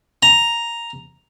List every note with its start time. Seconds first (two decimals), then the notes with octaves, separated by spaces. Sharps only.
0.23 A#5